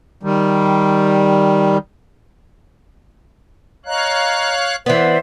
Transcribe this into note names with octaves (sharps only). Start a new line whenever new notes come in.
D#3 G3
C#5 D#5 F5 A#5 F#6
E3 B3 C5 D5 E5